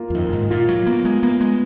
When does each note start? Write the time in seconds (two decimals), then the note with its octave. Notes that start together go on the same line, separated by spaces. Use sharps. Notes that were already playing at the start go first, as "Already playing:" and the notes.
Already playing: A#3 F4
0.10 F#2
0.15 F2 D#3
0.33 G#2
0.50 A#2 F4
0.68 F#3
0.86 A#3 B3
1.05 G#3
1.23 A#3 B3
1.40 G#3